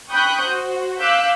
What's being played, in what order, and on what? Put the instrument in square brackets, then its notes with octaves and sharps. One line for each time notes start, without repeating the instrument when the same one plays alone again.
[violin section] G5 B5 C#6 D#6 F#6 G6
F#4 C5
F5 D6 E6 F#6 G6 B6